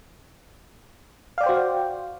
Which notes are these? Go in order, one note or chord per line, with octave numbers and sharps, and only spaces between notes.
F#4 C5 D5 F5 G5